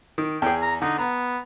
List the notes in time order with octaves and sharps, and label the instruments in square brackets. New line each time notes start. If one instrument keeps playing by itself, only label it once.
[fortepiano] D#3
[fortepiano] E2 G#4 [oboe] G5
[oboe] A#5
[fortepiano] D3 [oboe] D#4
[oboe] B3 [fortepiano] A#5